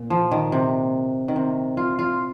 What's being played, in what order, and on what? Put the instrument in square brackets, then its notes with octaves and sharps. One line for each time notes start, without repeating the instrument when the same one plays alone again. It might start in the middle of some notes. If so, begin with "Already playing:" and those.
Already playing: [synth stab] A#2
[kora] F3
D#3
C3
D#3
C3
F4
F4